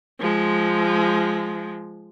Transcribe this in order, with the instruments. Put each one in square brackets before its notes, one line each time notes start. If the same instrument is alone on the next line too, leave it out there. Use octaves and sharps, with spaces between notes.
[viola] F3 G#3